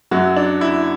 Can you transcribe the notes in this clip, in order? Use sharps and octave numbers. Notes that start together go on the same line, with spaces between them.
F#2 F#3 F#4
D4
E4